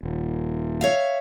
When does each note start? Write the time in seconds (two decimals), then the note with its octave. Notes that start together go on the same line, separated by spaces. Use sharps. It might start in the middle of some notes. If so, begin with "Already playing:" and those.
0.03 D#1
0.81 C#5 E5 F5